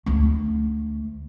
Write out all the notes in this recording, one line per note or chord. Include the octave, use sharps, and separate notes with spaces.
D2 A3